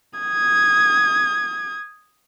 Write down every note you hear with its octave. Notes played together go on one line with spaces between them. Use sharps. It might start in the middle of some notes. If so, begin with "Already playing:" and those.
D#6 G#6